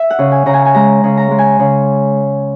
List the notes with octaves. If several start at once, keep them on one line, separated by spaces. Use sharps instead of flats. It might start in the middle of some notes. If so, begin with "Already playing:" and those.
Already playing: E5
F#5
C#3
G#5
C#3 A#5
G#5
G#5
G#3 A#5
C#3
A#5
G#3
G#5
C#3